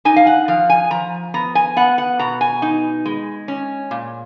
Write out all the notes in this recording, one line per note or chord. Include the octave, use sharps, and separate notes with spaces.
D#4 G#5
F5
F#5
F3 F5
G#5
F3 A#5
B3 A#5
G#5
B3 F#5
F#5
B2 A#5
G#5
D#4
G#3
C#4
A#2